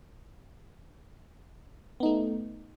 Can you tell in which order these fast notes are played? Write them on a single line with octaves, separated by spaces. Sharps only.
B3 D#4 A3